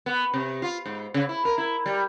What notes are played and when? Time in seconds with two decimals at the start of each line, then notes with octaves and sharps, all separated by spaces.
0.06 B3
0.34 C3
0.62 F4
0.86 G#2
1.14 C#3
1.29 E4
1.45 A#4
1.58 E4
1.86 G3